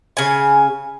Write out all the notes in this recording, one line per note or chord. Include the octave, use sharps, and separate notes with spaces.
C#3 G#5